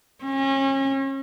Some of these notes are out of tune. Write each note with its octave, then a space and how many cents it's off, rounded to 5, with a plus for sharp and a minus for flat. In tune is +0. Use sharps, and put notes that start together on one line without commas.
C#4 -35